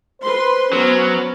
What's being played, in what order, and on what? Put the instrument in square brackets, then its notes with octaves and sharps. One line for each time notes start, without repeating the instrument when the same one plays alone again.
[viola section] B4 C6 [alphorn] C5
[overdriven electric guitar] F#3 [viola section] B3 C#4